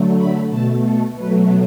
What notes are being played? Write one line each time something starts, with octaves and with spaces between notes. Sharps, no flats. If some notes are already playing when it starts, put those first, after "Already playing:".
Already playing: D3 F#3 A3
B5
B2 A3 A5
A4
B2 F#3 A3 B4